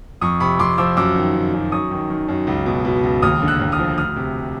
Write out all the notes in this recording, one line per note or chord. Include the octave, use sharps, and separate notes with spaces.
F2 C#6 D#6
C3 B5 C#6
F2 C6 D6
F3 D6 E6
F#2 D6 E6
D#3
D#3
F#2
F#2 C#6 D#6
D#3
D#3
F#2
C#2
B2
B2
C#2
D#2 D#6 F6
D3
E6 F#6
D#2
D#6 F6
F3
D2 D#6 F6
C3